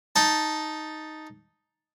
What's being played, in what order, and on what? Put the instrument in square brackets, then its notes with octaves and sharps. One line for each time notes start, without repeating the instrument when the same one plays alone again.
[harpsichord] D#4 A5